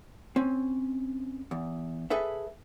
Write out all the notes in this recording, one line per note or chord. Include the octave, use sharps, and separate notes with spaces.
C4 C#4
E2
G#4 A4 B4 E5